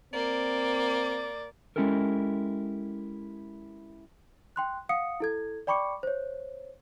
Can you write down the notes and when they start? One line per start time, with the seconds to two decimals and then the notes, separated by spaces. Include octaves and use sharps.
0.13 A#3 C4 D5
1.76 G#3 C#4 E4 G4 A4 A#4
4.56 G5 C6 F#6
4.89 F5 F#5 D#6 C#7
5.20 E4 A4 G#6
5.67 D5 G5 B5 C#6 D6 C#7
6.03 C5 C#5